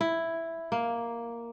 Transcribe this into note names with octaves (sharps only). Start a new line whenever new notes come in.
E4
A#3